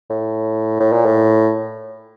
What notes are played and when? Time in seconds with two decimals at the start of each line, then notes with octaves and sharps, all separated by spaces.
0.10 A2
0.80 A2
0.92 A#2
1.05 A2